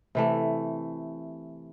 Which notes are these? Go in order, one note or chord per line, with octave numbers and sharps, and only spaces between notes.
C3 E3 A3